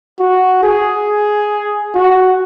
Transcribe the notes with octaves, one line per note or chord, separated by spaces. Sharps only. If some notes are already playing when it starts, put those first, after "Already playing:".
F#4
G#4
F#4